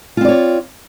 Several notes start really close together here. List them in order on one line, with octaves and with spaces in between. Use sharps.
F4 C4 D5 C#5